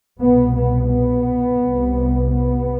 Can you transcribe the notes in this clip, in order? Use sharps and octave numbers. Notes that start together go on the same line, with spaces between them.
C2 B2 B3
B3
B3
C2 C3
B3